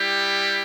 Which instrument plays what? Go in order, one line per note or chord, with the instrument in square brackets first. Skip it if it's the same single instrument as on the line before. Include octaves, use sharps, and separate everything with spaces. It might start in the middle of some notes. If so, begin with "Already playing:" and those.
Already playing: [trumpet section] G3 E4 G4